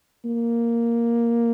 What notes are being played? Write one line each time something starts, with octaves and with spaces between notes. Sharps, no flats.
A#3